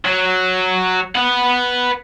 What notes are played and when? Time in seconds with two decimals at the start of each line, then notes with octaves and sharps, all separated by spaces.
0.05 F#3
1.15 B4 F#5